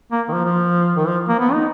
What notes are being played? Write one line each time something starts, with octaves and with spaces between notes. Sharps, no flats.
A#3
D#3
F3
F3
D#3
F3
A#3
B3
D#4